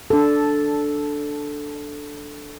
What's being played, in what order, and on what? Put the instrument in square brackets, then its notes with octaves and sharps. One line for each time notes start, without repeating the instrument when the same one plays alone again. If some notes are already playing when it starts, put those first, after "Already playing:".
[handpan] D4 A4